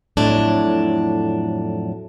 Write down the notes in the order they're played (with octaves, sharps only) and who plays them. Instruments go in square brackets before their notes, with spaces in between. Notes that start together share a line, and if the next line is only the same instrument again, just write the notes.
[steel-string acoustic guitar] F2 A2 F#3 D4